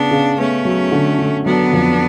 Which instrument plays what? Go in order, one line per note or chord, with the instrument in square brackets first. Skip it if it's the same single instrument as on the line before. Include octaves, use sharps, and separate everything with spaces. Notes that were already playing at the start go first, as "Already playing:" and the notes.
Already playing: [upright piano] C#3 [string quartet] B3 D4
[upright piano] C#3
[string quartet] A3 C#4 [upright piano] B3
[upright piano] F#3
D3
D3
[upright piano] F#3 [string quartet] B3 D4
[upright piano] F2